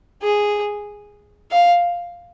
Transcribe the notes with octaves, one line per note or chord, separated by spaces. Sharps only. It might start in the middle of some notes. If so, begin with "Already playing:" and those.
G#4
F5